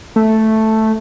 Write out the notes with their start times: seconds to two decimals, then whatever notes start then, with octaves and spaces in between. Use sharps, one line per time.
0.16 A3